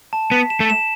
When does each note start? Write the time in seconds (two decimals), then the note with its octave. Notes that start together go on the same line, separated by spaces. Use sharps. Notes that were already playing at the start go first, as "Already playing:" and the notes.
0.13 A5
0.31 B3 B6
0.50 E7
0.60 A3
0.70 E7